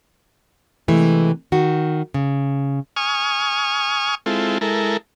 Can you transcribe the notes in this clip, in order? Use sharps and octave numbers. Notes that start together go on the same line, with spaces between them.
C3 E3 G#3 A3
D#3 F#4
C#3
G#5 C#6 D#6 F6
G#3 C4 E4 F4 A4
G#3 E4 A4 A#4